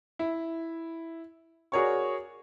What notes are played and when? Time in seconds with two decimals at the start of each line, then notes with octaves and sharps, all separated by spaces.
0.19 E4
1.72 F#4 G#4 A#4 C#5 D5 C#6